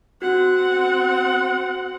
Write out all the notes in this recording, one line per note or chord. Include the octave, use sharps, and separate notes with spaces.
C4 F#4 F#5